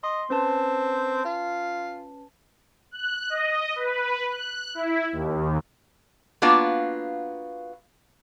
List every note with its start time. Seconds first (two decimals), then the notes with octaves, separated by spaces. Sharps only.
0.04 D#5 C6
0.30 C4 C#4 B4 A5
1.25 F4
2.91 F#6
3.30 D#5
3.76 B4
4.27 F#6
4.75 E4
5.12 D#2
6.42 A#3 B3 D4 F4 F#4 F5